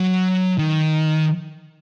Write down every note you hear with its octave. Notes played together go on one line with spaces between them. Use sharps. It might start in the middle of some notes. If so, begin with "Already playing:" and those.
Already playing: F#3
D#3